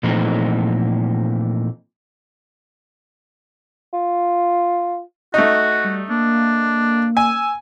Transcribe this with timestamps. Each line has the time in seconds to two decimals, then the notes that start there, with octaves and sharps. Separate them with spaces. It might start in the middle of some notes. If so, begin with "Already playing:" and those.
0.03 A#2 E3 F3 A3 C4 D#4
3.93 F4
5.34 A3 D#4 F#4
5.84 G3
6.10 A#3 D4
7.17 G#5 E6